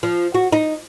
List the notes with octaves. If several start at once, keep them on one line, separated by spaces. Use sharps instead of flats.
F3
F#4
D#4